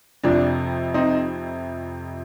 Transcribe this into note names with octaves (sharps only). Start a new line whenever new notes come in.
F2 C3 F3 D4
C4 D#4